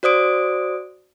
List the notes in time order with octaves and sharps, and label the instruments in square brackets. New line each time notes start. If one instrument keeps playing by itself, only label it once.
[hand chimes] F#4 C5 D5 D#6 D7